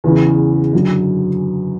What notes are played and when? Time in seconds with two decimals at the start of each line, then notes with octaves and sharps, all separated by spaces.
0.04 E2 C#3 E3
0.73 F#2 D3 F#3